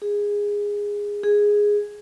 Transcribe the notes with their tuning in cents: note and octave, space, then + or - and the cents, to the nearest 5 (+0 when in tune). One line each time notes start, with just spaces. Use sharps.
G#4 -15
G#4 -5